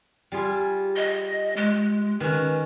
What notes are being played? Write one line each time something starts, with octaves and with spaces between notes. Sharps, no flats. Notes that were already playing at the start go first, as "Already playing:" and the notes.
G3 F4 G#4
D#5
G#3
D#3 C#4 B4